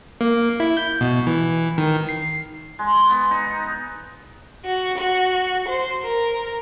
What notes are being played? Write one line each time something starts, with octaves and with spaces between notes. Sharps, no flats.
A#3
E4
G6
B2
E3
D#3
C7
G#3
B3
D#4
F#4
F#4
C5
A#4